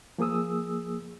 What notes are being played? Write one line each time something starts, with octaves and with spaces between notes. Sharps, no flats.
F3 A#3 G#4 D#6 E6